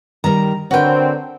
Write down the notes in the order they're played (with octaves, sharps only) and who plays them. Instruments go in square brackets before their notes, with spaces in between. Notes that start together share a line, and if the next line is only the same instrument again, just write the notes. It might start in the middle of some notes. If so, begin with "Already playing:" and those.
[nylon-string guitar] D#3 G3 A#4 [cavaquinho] A#5
[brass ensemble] D3 C4 [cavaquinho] F#4 G5 [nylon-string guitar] A#4 B4 C#5